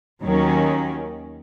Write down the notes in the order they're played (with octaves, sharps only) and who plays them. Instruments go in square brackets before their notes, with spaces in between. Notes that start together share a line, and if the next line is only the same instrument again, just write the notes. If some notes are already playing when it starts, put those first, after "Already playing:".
[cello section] D#2 D#3 F#3 C#4